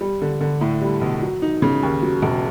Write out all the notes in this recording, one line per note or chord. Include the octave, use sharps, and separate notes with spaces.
G3
D3
D3
A2
G3
B1
F#3
D#4
C#3
D#2
F#3
E1